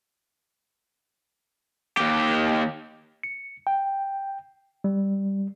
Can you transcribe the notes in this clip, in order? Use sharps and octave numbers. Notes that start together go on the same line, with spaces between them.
D#2 G4
C#7
G5
G3